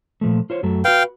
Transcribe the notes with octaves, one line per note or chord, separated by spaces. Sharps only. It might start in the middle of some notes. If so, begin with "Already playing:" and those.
A#2 F3 A3
F4 C5 C#5
F#2 F#3 A3
F#4 B4 F5 G5